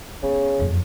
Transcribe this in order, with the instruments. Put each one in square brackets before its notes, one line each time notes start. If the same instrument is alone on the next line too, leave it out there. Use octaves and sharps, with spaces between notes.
[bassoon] C#3 [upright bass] B3
[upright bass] F#1 F2